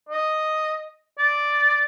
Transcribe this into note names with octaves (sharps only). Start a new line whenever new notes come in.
D#5
D5